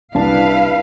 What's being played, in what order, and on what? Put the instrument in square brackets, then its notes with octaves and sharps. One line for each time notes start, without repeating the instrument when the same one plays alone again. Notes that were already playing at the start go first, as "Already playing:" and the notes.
[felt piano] C2 D4 A5 [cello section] E4 B4 F5